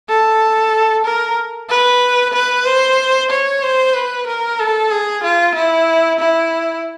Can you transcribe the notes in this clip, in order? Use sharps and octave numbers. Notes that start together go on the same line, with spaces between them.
A4
A#4
B4
B4
C5
C#5
C5
B4
A#4
A4
G#4
F4
E4
E4